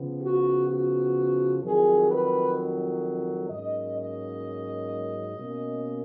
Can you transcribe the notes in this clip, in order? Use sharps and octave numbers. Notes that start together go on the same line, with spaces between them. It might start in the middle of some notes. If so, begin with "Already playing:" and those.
Already playing: C#3 F3 B3
F#4
F#4
F2 D#3 F#3 G#4
B4
G#2 F#3 A#3 C#4 D#5
D#5
B2 A#3 C#4